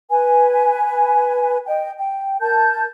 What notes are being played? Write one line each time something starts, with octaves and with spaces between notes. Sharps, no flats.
B4 G#5
D#5 G5
G5
A#4 A5 G6